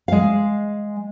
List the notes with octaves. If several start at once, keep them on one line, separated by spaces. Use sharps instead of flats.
G#3 F5